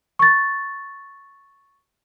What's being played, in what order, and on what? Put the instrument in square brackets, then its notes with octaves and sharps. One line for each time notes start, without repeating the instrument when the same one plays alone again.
[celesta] C#6 A6